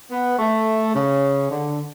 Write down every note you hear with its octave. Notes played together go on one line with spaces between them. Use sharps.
B3
A3
C#3
D3